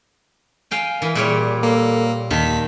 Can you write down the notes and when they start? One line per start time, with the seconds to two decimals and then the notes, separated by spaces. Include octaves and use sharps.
0.71 F5 G5 G#5
1.02 E3 A#4
1.15 A#2 G3 G#4 C#5
1.63 A#3 A4
2.31 D#2 D#3 A5 B6